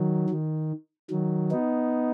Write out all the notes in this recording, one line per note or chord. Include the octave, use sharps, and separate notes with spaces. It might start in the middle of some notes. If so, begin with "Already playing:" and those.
Already playing: D#3 F#3
D#3
D#3 F#3
B3 D#4